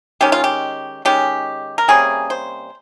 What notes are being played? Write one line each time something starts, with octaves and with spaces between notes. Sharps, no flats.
D#3 G#3 C#4 G4
F4
G4
D#3 G#3 C#4 G4
A#4
C3 G3 A#3 C#4 G#4
C5